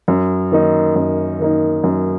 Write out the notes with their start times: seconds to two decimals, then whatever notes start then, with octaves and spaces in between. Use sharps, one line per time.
0.08 F#2
0.51 D#3 A#3 D#4
0.96 F#2
1.39 D#3 A#3 D#4
1.84 F#2